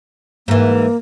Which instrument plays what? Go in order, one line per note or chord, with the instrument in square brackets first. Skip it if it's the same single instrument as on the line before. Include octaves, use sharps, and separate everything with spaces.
[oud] G#2 E3 [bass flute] A#3